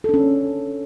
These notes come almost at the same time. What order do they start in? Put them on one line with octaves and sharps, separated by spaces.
A4 D4 C#4